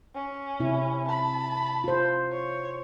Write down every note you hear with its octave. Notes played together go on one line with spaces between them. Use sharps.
C#4
C3 E4
A5 B5
F4 C5
C#5